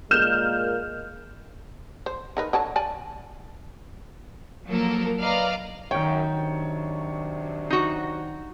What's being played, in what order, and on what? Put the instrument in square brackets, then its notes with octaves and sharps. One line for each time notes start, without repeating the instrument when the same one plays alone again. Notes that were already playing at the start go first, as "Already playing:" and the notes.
[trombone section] A#2 G#3 A#3 [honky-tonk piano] F6 G6 E7
[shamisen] C5
D#4 A#4 B4
D3 F#3 A5
D5 G#5 A5
[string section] F3 F#3 A#3 A4 A#4
B4 D5 D#5 F5 A#5 F6
[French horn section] F#2 [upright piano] D#3 C#5 [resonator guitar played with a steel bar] G5
[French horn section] C3 F#3 D4
[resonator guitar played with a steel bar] D#4 F#4